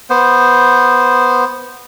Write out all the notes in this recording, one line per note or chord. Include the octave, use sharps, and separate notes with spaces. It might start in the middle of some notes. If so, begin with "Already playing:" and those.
B3 C5